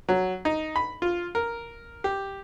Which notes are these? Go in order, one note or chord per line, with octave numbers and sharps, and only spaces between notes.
F#3
D#4
B5
F4
A#4
G4